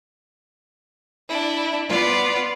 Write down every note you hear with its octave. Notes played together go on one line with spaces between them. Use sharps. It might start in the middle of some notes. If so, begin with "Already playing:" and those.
D4 E4
B3 F4 D5